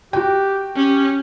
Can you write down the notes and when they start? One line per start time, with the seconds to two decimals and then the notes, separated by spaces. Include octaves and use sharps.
0.13 F#4 G4 G5
0.76 C#4 G4